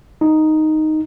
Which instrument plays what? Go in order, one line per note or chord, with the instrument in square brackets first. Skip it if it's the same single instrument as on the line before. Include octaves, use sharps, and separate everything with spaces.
[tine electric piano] D#4